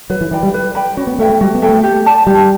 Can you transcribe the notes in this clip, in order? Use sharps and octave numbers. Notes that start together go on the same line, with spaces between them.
F#3 B4
E3
E3 D5 G5 B5
G3
B4
D5 G5 B5
C#4 F#4
B3
A3 A4 E5 G5
A3
G3 F#4
B3
A4 E5 G5
A3
G4
D5 A5
G3 G4